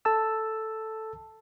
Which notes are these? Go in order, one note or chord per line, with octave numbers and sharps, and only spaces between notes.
A4 A5 E6